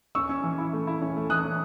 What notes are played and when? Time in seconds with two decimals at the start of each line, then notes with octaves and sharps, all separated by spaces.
0.15 C#4 C#6 E6
0.29 C#4
0.43 E3
0.58 E4
0.73 A3
0.87 E4
1.01 C#4
1.16 A3
1.30 E3 D#6 F#6
1.44 C#4